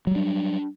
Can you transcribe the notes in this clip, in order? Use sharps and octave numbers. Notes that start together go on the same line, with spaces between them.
F#3 G3 D4